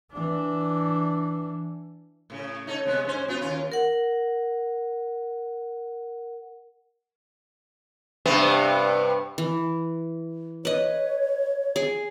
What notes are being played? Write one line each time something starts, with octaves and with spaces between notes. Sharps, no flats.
E3 D4
A2 C#3
D#4 A4 C#5
C3 G#3 B3
G#2 C#4 C5
B3 F4 F#4
D#2 C#4 F4
A#4 F#5
G2 C3 B3
E3
B4 C#5 D#5
G#4